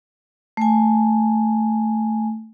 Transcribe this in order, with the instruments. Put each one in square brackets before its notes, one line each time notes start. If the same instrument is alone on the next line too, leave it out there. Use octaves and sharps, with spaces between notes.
[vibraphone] A3 G#5